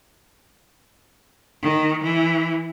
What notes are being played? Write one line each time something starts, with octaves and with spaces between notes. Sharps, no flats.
D#3
E3